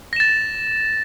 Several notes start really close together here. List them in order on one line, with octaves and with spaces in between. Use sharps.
A#6 E7 A6